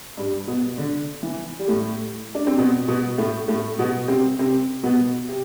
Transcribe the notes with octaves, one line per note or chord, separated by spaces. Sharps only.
G2 G3
B2 B3
D3
E3
G3
A2 A3
D4
C4
B2 B3
B2 B3
A2 A3
A2 A3
B2 B3
C3 C4
C3 C4
B2 B3
C3